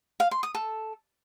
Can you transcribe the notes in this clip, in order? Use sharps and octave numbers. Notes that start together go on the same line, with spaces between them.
F5
C6
D#6
A4